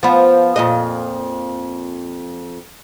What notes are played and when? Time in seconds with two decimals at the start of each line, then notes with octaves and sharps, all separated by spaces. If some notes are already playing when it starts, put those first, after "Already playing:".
0.03 F3 B3
0.56 F2 A#2 D#5